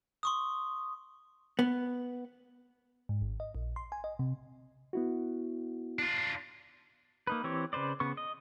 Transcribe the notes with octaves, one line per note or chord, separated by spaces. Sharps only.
C6 C#6 D#6
B3
G#2
G#1
D#5
A#1
C6
G#5
D#5
C3
B3 E4 F#4
D4 F4
A#3 D#4 B4
E3 C4 G4 C#5
C#3 B4 C5 D5
C#3 B3 C#6
D#5